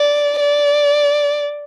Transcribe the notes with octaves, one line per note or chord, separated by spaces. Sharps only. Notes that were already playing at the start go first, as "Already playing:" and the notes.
Already playing: D5
D5